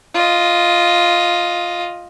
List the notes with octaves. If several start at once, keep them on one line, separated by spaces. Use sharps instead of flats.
F4 D#5